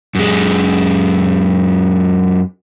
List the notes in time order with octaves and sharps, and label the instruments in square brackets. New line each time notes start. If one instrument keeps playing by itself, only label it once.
[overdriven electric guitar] F#2 G#3